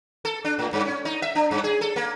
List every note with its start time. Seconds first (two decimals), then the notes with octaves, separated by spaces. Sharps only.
0.25 A4
0.45 D4
0.59 A2
0.73 G2
0.85 C#4
1.05 D#4
1.22 E5
1.35 D4
1.51 G2
1.64 G#4
1.81 A4
1.96 A#3